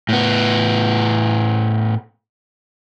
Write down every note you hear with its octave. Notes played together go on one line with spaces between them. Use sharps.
A2 B3